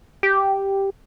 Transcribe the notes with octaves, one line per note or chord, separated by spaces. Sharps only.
G4